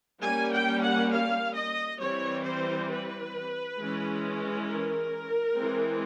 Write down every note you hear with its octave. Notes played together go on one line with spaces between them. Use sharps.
G3 A#3 C#4 G#5
G5
F#5
F5
D#5
E3 G3 C4 C#5
C5
B4
E3 G#3 C#4
A#4
E3 G#3 C4